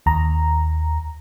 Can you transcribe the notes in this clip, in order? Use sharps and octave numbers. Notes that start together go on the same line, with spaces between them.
D#2 A#5